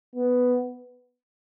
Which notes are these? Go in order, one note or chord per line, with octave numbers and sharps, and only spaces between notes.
B3